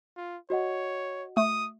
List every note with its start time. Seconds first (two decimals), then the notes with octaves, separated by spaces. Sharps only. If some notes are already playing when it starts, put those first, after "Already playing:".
0.17 F4
0.50 F#4 C#5 D#5 F#5
1.37 A3 D#6